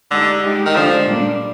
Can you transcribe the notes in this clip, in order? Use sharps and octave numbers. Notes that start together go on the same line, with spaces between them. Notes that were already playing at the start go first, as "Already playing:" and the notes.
D3 G#3 D#4 G4
G#3 D#4 G4
D#3
D3 F3 G#3 D4
A#2 G3 A#3 D4